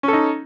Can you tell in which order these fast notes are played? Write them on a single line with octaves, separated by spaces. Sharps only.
C#4 A4 D#4